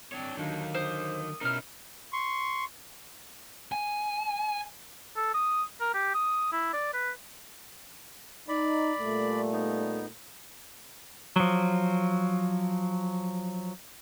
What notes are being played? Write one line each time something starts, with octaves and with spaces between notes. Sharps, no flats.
C4 D4 C#5
D3 D#3 F#3 A#3 D4 D#4
C5 D6 D#6
B2 C#4 D#4 E4 A#4 F5 F6
C6 C#6
G#5
A4
D#6
A#4
G4
D#6
E4
D5
B4
D#4 D5 B5
A#2 G3 A3
B3 D#4
F3 F#3